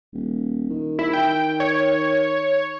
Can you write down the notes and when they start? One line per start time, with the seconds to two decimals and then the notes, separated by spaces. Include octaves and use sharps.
0.13 D#1
0.70 D#3
0.99 E4
1.13 G5
1.60 C#5